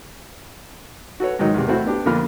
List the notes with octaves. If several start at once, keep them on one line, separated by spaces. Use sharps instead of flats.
F#4 A4 B4 C#5
G#2 D#3 F#3 D#4
E2 C3
A3 C4 E4 F#4 C5 E5
B3 D4 G4
F2 D3 A#3 F4 B5 F6